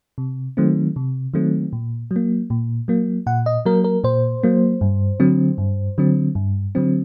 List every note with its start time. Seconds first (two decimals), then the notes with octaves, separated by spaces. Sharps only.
0.18 C3
0.57 D#3 F#3 A3 C4
0.96 C3
1.34 D#3 F#3 A3 C4
1.73 A#2
2.11 F#3
2.16 A#3
2.50 A#2
2.88 F#3 A#3
3.26 A#2 F#5
3.46 D#5
3.66 F#3 A#3 A#4
3.84 A#4
4.04 A#2 C5
4.43 F#3 A#3
4.81 G2
5.20 D3 F#3 C4
5.58 G2
5.98 D3 F#3 C4
6.35 G2
6.75 D3 F#3 C4